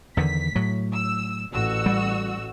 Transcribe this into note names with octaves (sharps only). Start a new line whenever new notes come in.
E2 D3 D#3 B6
A2 F#3
E6
A1 F#4 E6
G3